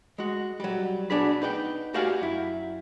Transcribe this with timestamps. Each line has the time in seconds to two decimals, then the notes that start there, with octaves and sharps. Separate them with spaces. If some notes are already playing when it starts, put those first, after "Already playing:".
0.18 G#3 F#4
0.60 F#3 G3
1.10 B3 D4 F#4 G#4 B5
1.42 D#4 B4 F#5 G5
1.94 F#4 G4 D5 F5 F#5 G#5
2.21 F#2 E4